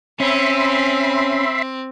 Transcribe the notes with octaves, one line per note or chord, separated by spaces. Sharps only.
C4 C#4 E5 B5 C6